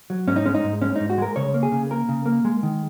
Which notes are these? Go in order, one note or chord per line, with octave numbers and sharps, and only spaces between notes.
F#3
G#2 C#4
D#4
G#3 C#4
D#4
G#2
G#3 C#4
D#4
G#2
F#4
G#3 A#4
C#3 C#5
A#3
G#4
C#3
A#3 A#4
C#3
A#3
G#3
D#3